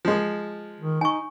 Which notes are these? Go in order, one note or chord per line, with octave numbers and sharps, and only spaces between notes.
F3 G#3
D#3
D#4 G#5 C#6